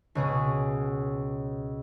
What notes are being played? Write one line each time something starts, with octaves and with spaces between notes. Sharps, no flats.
C#2 B2 G#4